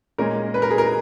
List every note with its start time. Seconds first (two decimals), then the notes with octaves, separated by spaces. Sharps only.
0.18 A#2 G#3 C#4 A#4
0.54 B4
0.62 A#4
0.71 G#4
0.78 A#4